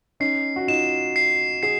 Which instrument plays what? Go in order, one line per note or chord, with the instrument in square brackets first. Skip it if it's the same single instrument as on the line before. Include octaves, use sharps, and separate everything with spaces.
[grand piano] C#4 D#4 [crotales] C7
[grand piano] F#4
[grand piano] D#4 F4 [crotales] E7
[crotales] C7
[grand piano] F#4 G#4 [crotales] C7